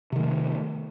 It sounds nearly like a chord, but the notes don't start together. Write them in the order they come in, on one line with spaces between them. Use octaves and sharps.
C3 D#3 A3